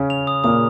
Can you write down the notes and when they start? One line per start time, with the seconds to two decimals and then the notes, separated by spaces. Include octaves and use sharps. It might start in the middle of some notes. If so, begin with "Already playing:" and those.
Already playing: C#3 C#4
0.10 F7
0.27 D#6
0.44 A#2 A#3 D#6